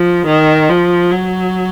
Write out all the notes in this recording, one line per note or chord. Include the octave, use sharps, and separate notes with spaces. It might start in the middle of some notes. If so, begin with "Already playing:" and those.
Already playing: F3
D#3
F3
F#3